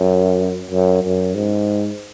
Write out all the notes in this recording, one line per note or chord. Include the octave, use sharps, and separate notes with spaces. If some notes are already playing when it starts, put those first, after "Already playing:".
Already playing: F#2
F#2
F#2
G#2